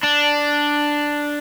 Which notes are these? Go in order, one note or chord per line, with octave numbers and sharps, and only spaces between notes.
D4